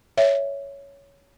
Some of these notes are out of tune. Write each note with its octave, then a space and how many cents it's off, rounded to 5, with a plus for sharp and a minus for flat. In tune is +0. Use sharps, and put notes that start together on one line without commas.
C#5 +10 E5 +0